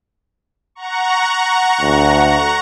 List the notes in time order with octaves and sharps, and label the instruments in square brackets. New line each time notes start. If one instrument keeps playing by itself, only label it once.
[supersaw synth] F#5 A#5 C#6
[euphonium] D2